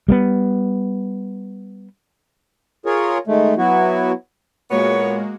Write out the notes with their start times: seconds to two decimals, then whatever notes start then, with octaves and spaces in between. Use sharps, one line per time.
0.08 G3 A#3 B3
2.86 F4 G#4 A#4 C#5
3.27 D#3 G#3 A3
3.58 F#3 B3 E4 F#4
4.71 A#2 G#3 A#3 B3 F#4 C#5